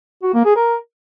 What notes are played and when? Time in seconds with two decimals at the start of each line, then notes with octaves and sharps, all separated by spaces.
0.23 F#4
0.34 A#3
0.45 G#4
0.56 A#4